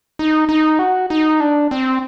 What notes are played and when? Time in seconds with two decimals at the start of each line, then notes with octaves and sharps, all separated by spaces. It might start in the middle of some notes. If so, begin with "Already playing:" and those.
0.19 D#4
0.49 D#4
0.79 F#4
1.10 D#4
1.40 D4
1.71 C4